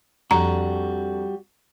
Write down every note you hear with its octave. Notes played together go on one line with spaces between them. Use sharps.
F2 G3 D4 F#4 A#5